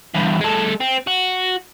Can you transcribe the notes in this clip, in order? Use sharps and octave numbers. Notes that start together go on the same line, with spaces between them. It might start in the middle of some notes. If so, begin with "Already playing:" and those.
E2 G2
G#3 A4
C4
F#4